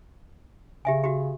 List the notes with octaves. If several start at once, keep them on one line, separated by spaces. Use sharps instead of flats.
C#3 G4 E5 G#5
F#4 G4